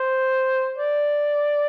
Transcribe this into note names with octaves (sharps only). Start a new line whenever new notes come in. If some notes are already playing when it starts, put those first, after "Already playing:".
Already playing: C5
D5